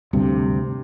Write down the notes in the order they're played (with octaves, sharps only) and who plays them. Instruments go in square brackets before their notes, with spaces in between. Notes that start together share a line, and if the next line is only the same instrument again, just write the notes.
[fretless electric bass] D2 G2 C3